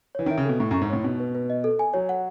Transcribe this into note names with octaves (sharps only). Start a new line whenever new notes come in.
E3 C#5
D#3
E5
C#3
B2 A4
A2 C#6
F#2
C#6
G#2
A2 C#5
B2 D#4
B4
B4
D#5
A4
G#5
F#3 C#5
F#5